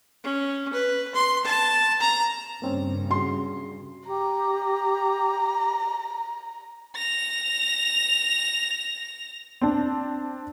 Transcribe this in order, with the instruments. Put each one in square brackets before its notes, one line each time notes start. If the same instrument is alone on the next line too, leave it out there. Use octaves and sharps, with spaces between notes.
[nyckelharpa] C#4
B4
C6
A5
A#5
[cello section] G2 C#3 [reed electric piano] A#3 C4 C#4
[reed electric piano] F#4 G#4 [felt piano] C6
[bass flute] G4 [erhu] A#5
[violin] A#6 F7
[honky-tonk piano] C4 D4